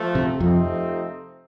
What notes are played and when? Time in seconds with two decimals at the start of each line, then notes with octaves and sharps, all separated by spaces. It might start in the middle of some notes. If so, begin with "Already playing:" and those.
Already playing: F3 A3
0.15 C3
0.40 F2 C3 F3 A3 C4 D#4